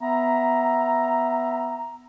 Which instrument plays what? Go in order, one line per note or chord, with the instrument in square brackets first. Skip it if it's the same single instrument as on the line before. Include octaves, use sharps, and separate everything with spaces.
[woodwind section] B3 E5 A#5